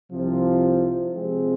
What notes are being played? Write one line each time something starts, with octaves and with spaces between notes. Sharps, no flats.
C2 C3 F3
C3 F3 G#3 C4